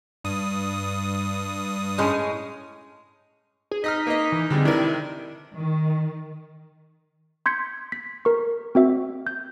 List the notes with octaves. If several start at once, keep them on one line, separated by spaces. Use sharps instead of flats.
G2 D#6
A2 G#3 C#4
G#4
D#4 D#5 D#6 F6 B6
A#3 D#5
E3
F2 D3 G3 G#3
C3 D#3 D4 E4 A#4
D#3
C6 G6 G#6 B6 C#7
B6
A#4 C#6
C4 F#4 E5
G6